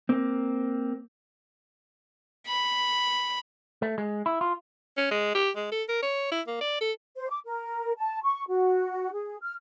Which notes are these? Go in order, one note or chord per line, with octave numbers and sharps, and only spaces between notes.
A#3 C4
B5
A3
G#3
E4
F4
C#4
G#3
G4
G#3
A4
A#4
C#5
E4
A#3
D5
A4
C5
D6
A#4
A5
C#6
F#4
G#4
F6